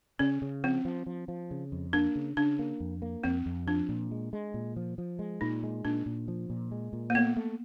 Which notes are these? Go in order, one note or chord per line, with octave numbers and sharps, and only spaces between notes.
C#3 C#4
C#3
F3 C4
F3
F3
F3
C#3
F2
A#3 D4
C#3
C#3 D4
A#3
F2
A#3
F2 C4
F2
F3 D4
A#2
G#3
G#3
A#2
F3
F3
G#3
A#2 D#4
G#3
A#2 D4
A#2
F3
A#2
G#3
A#2
A#3
A3 B3
A3